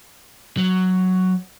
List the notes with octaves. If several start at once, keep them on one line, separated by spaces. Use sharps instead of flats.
F#3